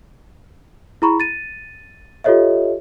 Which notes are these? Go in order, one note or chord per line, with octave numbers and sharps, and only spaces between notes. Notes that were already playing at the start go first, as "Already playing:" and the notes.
E4 G#4 A#5 B5 C#6
A6 D#7
F4 G4 A4 C#5 D#5 E5